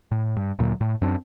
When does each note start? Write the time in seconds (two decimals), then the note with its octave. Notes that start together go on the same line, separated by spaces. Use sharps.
0.11 A2
0.37 G2
0.59 D2 A#2 F#3
0.81 A2
1.02 F#2 C4 D4